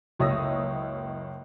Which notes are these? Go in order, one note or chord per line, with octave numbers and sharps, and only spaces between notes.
F#1 C#2 C#5 D#6 E6 A#6